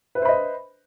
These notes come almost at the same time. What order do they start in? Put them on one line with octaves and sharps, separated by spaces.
B4 E5 C5 B5 D#5